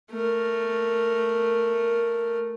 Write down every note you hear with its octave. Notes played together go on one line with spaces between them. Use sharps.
A3 A#4